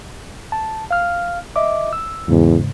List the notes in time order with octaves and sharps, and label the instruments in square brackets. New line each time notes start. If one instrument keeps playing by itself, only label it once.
[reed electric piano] A5
F5 F6
D#5 E5 D6
E6
[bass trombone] E2 [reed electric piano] G#2 C#3